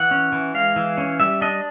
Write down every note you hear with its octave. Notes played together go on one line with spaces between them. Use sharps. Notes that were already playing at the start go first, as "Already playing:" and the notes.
Already playing: E3 F#5
C#4
E3
G#3 F5
E3
C#4
G3 E5
D4 D#5